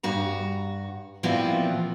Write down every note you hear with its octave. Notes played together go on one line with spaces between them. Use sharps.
G2 F#4 A#5
A#2 E3 F3 B3 C4 F#4